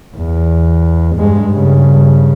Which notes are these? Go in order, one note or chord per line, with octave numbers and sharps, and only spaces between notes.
E2
G2 G#3
G2 C#3